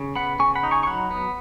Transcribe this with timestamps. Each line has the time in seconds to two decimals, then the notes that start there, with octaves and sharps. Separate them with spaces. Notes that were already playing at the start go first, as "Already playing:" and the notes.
Already playing: C#3
0.15 B3 F#5 B5
0.39 C#3 G#5 C#6
0.55 F#5 B5
0.63 D#4
0.71 G#5 C#6
0.83 C#6
0.87 F#3 F#5 B5
1.11 B3